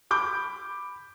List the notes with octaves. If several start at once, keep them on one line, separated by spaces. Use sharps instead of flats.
B5 D6 G6